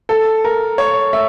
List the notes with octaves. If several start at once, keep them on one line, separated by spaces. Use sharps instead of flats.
A4
A#4
C#5
E5